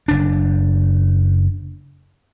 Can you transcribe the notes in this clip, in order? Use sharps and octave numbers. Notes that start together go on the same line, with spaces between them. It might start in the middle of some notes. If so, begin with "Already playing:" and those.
F#1 D4